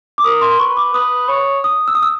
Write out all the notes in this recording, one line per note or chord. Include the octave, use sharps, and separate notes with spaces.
D6
A#4 D#6
C6
B4 C#6
D6
B4 D#6
C#5
D#6
E6
D#6
E6